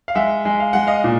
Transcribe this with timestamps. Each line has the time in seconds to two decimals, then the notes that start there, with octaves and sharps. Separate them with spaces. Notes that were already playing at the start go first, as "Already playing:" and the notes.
0.08 F5
0.15 G#3 E5 F#5
0.45 G#3
0.60 F5
0.73 G#3 F#5
0.87 D#5 F5
1.04 A#2